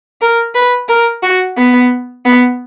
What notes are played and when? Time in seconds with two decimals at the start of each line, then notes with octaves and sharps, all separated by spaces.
0.21 A#4
0.55 B4
0.88 A#4
1.23 F#4
1.57 B3
2.26 B3